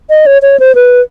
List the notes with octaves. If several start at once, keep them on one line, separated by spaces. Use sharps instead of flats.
D#5
C#5
C#5
C5
B4